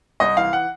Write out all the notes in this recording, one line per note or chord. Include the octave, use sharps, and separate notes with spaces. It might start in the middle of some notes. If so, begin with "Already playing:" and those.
C2 D#5
E3 F5
F#5